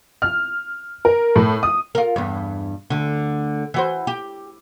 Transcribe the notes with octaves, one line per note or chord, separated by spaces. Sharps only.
F6
A#4
A2
D#6
F4 A#4
E2 G2
D2 D3
E3 F#4 C5
G4